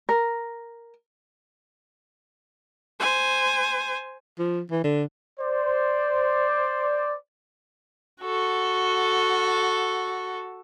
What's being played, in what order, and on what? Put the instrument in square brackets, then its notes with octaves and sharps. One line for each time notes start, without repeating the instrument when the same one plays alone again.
[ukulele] A#4
[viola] C5 G#5
[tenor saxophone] F3
E3
D3
[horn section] C5 D5
[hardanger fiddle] F#4 A4